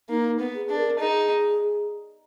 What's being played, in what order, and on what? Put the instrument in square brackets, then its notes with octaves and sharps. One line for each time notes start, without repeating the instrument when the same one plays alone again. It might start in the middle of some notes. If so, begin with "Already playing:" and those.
[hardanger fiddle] A#3 [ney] D#4
[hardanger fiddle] B3
[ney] G#4
[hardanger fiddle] D4
[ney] A#4
[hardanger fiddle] D#4 [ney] G#4